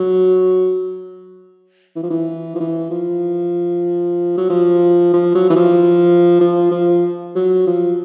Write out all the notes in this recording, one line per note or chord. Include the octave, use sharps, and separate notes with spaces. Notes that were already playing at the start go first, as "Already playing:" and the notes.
Already playing: F#3
E3
F3
E3
F3
E3
F3
F#3
F3
F3
F#3
E3
F3
F3
F3
F#3
F3